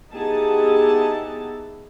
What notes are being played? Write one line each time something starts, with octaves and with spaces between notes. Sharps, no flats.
B3 D#4 E4 G4 G#4 A5